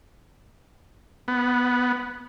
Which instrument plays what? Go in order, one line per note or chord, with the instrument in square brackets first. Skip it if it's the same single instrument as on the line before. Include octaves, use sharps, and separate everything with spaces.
[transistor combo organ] B3